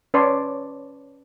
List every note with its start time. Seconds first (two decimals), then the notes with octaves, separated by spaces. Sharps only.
0.14 C#4 B4 C#5 D5 A5 C6